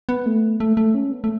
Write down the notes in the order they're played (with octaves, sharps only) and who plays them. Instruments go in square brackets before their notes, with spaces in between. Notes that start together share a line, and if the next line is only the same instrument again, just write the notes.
[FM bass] B3
A3
A3
A3
C#4
B3
A3